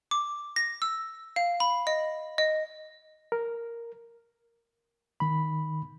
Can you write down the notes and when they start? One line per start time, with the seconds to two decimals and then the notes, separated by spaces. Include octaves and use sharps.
0.11 D6
0.56 A#6
0.82 E6
1.36 F5
1.60 B5
1.87 D#5
2.38 D#5
3.32 A#4
5.20 D#3 B5